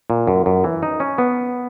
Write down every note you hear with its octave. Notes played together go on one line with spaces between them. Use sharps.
A#2
F#2
F#2
E3
D#4
C#4
B3